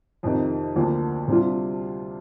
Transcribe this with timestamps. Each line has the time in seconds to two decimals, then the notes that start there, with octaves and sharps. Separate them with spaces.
0.23 F2 C3 D#3
0.76 D2 D3 F3 A#3
1.28 C3 G3 D4 F4